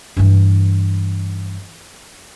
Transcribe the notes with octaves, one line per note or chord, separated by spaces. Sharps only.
G2 E3